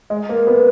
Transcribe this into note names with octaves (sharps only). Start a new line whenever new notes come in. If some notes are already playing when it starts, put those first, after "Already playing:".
G#3
A#3
B3